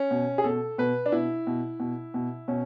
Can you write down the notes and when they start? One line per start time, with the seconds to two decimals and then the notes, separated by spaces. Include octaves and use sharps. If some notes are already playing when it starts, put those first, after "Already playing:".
Already playing: C#4
0.11 B2
0.38 G#4
0.44 B2 A4
0.78 B2 B4
1.06 D4
1.12 B2 E4
1.47 B2
1.80 B2
2.14 B2
2.48 B2 C#4